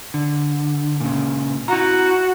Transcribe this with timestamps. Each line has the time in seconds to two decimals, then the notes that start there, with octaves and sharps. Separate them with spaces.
0.14 D3
1.00 A#2 C#3
1.68 E4 F#4 A#5